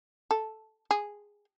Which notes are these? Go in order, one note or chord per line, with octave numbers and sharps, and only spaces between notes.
A4
G#4